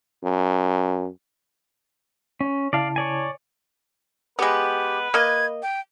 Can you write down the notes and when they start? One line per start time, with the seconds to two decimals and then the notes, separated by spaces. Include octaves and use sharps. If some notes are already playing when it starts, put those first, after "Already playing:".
0.23 F#2
2.41 C#4
2.73 C#3 E4 D5 F5 A5
2.96 C#5 D5 G#5
4.39 G#3 B3 G4 B4
5.14 A#3 D#5 G#6
5.63 G5